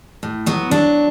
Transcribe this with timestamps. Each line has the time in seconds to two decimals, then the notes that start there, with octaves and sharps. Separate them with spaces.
0.23 A2
0.46 F#3 B3
0.71 F#3 D4